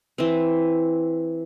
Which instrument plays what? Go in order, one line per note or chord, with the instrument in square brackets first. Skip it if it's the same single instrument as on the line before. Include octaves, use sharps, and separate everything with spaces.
[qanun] E3 C4